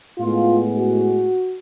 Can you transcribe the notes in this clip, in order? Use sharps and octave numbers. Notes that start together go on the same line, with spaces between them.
A2 G#3 B3 F4
F#4